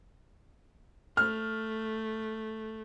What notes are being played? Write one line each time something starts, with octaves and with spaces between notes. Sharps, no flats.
A3 F6